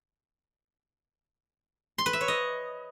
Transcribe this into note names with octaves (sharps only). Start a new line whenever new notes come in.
C6
B4
E5
C#5
D#5